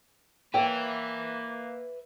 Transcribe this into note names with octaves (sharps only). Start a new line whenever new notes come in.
A#3 B4 C#5 E5 G5